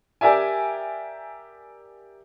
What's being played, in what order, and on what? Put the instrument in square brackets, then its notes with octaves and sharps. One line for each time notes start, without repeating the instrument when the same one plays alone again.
[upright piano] G4 A#4 D5 E5 G#5